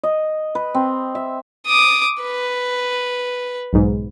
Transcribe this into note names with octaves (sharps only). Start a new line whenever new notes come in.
D#5
B4
C4
E5
D6 D#6
B4
B1 G#2